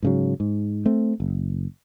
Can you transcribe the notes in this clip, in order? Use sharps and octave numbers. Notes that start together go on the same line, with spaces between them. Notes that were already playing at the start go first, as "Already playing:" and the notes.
G#2 C#3 F#3
G#2
A3 C4
F#1